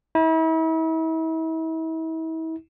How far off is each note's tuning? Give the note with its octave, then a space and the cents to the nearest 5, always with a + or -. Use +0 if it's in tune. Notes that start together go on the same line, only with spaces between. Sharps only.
E4 -40